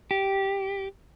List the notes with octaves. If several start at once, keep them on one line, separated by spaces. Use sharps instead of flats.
G4